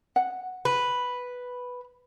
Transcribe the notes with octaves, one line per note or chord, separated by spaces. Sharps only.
F#5
B4